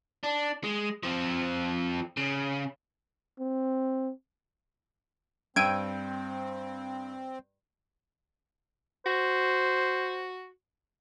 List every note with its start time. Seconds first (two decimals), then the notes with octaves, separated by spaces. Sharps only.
0.23 D4
0.64 G#3
1.03 F3 C4
2.17 C#3
3.39 C4
5.56 G2 C4 G5 E6 G#6 D7 D#7
9.06 F#4 C5